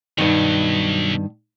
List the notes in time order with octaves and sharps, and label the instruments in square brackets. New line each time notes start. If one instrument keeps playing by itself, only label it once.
[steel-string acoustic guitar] G2 D#3 [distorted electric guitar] B2 F#3